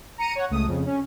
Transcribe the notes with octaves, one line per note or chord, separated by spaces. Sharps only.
A#5 C#7 D#7
C#5 F#5
C#2 A3 D#6
F2 C#3
C#4